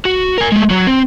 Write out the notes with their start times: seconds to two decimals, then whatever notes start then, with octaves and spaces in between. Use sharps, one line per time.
0.05 F#4
0.38 A#4 G#5
0.52 G#3 A3
0.70 F#3 F#4
0.87 C4